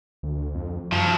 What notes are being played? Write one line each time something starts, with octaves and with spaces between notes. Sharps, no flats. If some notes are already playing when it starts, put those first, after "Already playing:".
D2
F2
F#2 F3 F#3